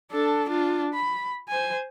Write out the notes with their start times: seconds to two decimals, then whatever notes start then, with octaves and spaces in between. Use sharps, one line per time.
0.11 D4 A4
0.49 D4 F4
0.94 B5
1.49 C5 G#5